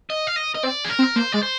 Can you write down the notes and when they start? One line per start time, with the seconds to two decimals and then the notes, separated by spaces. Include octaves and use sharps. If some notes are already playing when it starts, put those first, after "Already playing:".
0.10 D#5
0.27 F5
0.36 D#5
0.55 D#5
0.63 C4 D5
0.85 G#4
0.89 A#4
0.99 C4
1.16 A#3 C5
1.32 G#3 D5
1.43 C5